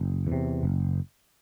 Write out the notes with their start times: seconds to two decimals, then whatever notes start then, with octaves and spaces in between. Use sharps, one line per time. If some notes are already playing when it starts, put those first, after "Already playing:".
Already playing: F#1
0.27 E2
0.32 C3
0.63 F#1